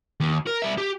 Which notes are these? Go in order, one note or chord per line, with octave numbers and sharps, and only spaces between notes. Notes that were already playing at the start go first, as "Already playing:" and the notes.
D#2
A#4
G3 E5
G4